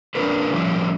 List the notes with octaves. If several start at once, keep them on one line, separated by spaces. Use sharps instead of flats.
A#3 C#4 D4 F4 A#4 B4
A2 F3 G3 A#3 C#4 E4